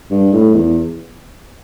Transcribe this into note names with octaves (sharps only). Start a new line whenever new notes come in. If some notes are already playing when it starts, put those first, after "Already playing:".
G2
A2
E2